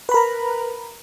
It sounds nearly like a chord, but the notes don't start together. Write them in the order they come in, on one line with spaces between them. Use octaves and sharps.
B4 B5 A#4 A#5